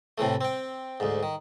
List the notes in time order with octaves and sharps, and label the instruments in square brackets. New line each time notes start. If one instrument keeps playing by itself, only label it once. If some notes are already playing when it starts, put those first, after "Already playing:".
[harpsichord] A2 C3 E3 A3
C4 G5
D2 G#2
D#3